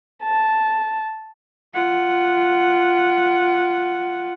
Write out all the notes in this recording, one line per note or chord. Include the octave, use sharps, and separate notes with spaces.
A5
F4 F#5